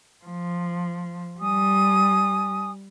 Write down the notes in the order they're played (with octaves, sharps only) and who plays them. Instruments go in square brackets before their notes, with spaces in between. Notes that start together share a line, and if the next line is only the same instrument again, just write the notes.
[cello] F3
[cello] G3 [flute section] G#5 D#6